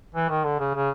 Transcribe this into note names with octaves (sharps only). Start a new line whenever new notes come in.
E3
D#3
D3
C#3
C#3